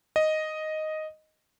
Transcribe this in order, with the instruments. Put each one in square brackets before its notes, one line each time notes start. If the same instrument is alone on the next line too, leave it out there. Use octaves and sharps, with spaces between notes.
[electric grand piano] D#5